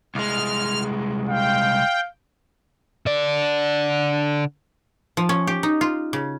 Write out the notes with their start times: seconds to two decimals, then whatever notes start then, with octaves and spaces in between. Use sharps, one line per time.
0.15 C2 G#3 F6
1.29 F5 G5
3.06 D3 D5
5.17 F3
5.29 C#4
5.47 G4
5.63 D#4
5.81 F4
6.13 C#3